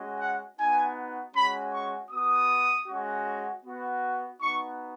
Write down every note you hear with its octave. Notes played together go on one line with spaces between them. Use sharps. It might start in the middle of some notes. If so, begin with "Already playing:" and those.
Already playing: G#3 C#4 F#4
F#5
B3 D#4 F#4 G#5
G#3 C#4 F#4 B5
C#6
B3 F#4 D#6
G#3 C#4 F#4
B3 F#4
B3 D#4 F#4 C#6